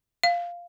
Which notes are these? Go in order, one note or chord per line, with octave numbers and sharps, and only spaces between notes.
F5